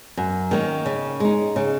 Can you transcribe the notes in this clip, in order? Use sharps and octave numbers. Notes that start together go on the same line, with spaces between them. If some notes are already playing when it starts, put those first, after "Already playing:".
F#2
D#3 A#3 C#4
C#3
G#3 D#4
C#3